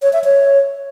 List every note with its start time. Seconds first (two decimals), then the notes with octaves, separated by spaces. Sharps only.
0.02 C#5
0.13 E5
0.24 C#5